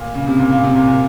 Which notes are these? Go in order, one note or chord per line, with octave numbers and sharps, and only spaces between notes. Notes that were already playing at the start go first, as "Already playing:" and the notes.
Already playing: A#2
C#3
C3
A#2
A#2
C3
A#2
A#2